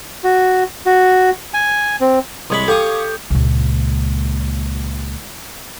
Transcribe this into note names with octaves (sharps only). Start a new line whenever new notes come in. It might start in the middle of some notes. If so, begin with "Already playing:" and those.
F#4
F#4
G#5
C4
C2 G#3 C#5 B5 D#6
G4 A4 F5 C#6 D#6
C#2 A#2